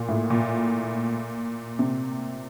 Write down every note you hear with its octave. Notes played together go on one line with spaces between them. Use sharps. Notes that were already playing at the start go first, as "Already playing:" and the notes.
Already playing: A#2
A2
A#2
C3